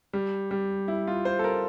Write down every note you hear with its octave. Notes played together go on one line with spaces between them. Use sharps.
G3
G3
E4
F4
C5
A4
A#4